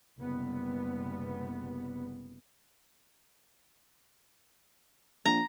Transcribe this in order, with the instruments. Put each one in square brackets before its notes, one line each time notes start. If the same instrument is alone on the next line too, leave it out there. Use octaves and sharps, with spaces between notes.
[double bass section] F#1 C3 G3 B3
[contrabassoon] A#1 [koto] A#5